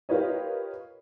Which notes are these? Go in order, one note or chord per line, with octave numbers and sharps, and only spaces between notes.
F4 G4 A#4 B4 C#5 D#5